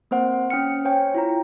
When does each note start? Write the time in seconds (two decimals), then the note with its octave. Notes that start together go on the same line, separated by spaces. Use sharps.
0.11 A#3 C4 C5 F#5
0.50 C#4 G5 F6 C#7
0.85 C5 C#5 G5 G#5
1.14 E4 F4 A#5